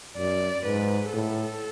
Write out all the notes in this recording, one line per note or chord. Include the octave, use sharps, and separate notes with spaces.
F#2 D5
G#2 B4
A2 A4